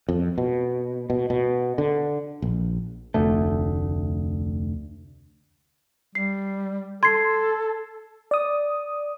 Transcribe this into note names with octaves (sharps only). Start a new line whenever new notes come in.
F2
B2
B2
B2
D3
A#1
F1 D2 A3
G3 C7
A4 C6 G#6 C7
D5 D#6